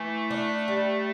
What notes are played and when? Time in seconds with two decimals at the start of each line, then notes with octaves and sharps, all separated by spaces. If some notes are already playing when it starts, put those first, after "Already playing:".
Already playing: E3 A3
0.31 D4
0.68 G3